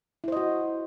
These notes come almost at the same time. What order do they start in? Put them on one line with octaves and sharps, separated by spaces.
E4 C5 D#5 F#4